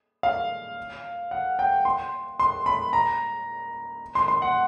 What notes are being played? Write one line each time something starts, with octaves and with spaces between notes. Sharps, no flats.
F5
F#5
G5
C6
C6
B5
A#5
C6
C6
F#5